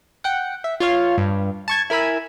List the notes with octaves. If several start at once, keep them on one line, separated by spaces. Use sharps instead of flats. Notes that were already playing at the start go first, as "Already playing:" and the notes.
F#5 G5
E5
F4 C#5 F5
G2
A5 C#6 G#6
E4 A#4 G#5 B5 E6